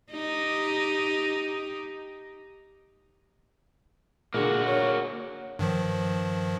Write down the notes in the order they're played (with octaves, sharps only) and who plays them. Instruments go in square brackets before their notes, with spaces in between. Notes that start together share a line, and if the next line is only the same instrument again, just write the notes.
[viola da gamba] D#4 G4
[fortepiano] A#2 D3 [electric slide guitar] A#3 F#4 [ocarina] G#4
[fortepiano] A#4 C#6 [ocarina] C#5
[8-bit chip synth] G2 D#3 F3